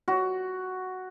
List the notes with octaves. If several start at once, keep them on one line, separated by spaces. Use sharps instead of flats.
F#4